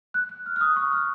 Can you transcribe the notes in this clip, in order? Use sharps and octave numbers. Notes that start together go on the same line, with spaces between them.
F#6
F#6
F6
F6
D#6
C#6
F6